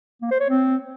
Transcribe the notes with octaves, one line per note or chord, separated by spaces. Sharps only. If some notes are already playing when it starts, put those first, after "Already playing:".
A#3
C5
C#5
C4